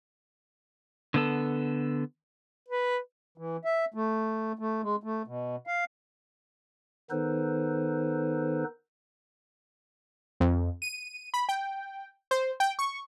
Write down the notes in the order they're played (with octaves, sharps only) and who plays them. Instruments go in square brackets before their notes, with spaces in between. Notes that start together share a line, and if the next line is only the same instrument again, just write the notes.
[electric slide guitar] D3 B3 A4
[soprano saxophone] B4
[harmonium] E3
E5
A3
A3
G#3
A3
B2
F5
[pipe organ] D#3 B3 D#4 A4 B4 C5
[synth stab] F2
D#7
B5
G5
C5
G5
C#6